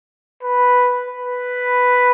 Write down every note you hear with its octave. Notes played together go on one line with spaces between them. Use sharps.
B4
B4